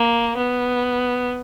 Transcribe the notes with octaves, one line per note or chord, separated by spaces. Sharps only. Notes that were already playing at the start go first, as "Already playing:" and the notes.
Already playing: A#3
B3